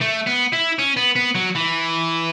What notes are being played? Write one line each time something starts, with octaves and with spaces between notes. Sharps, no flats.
A3
B3
E4
C#4
B3
B3
F#3
E3